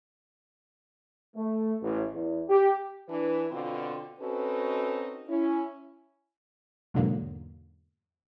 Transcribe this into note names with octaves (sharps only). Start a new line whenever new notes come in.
A3
A1
E2
G4
E3 D4 B4
B2 D3 C4 F4
C4 C#4 D#4 F#4 A4 B4
C#4 E4
E2 G#2 B2 D3 F#3 A#3